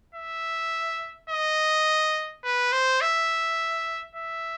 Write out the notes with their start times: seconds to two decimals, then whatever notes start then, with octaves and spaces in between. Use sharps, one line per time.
0.15 E5
1.30 D#5
2.44 B4
2.72 C5
3.01 E5
4.16 E5